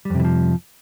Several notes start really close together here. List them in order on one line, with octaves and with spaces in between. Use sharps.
G3 F2 C3 E3 F3